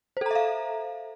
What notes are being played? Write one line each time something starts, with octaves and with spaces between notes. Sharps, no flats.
A4 C5 E5 F5 A#5